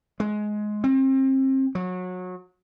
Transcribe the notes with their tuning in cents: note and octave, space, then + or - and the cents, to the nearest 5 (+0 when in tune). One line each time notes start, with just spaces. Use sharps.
G#3 +15
C4 +30
F#3 -25